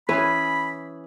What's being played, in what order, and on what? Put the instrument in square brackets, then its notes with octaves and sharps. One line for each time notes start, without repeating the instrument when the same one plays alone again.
[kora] E3 C#4 G#4 [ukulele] B4 [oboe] B5